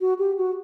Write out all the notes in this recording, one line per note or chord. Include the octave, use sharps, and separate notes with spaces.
F#4
G4
F#4